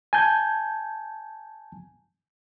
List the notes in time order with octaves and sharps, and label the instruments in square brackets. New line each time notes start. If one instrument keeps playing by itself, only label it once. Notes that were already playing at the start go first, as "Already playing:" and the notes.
[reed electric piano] G#5 A5 G6 G#6